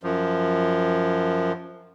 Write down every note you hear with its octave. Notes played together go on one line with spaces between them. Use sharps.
F#2 F3